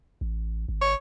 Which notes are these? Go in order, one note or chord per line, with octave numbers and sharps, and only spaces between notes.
A1
G#1
C#5